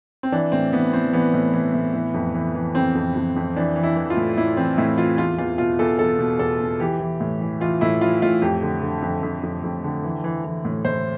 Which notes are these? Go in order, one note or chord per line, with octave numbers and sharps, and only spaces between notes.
C4
E3 D4
A2 C4
E3 B3
E3 C4
E3 B3
A2
E3
A2
E3
F2
E3
E3
F2 C4
F2
F2
F2
E3 D4
E3
E4
E3
F4
A2
A2 E4
E3 C4
A2 E4
E3 F4
E2 F4
E2 F4
B2 F4
E2 A4
E2 A4
B2
E2 A4
B2
E3 G4
E3
A2
E3
E3 F4
A2 E4
E3 F4
A2 F4
F2 G4
D3
D3
F2
F2
F2
F2
D3
E3
E3
E3
A2
A2 C5